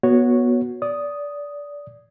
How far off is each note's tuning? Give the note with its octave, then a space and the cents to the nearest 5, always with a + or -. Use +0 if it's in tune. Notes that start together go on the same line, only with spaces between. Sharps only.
B3 -20 F#4 -5 C#5 +0
D5 -20 D#6 +0